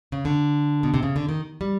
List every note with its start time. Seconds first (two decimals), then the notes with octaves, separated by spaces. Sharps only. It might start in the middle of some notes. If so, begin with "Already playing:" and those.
0.12 C#3
0.25 D3
0.83 B2
0.94 C3
1.03 C#3
1.16 D3
1.29 D#3
1.61 G3